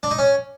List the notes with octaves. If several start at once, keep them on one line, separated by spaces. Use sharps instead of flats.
D4
D#4
C#4